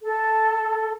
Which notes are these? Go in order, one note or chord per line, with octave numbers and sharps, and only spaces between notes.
A4